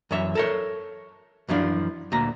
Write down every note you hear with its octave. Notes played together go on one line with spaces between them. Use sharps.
F#2 E3 C#5 E5
A4 A#4 C#5
F#2 E3 F3 D4 F4
D2 A#2 A#5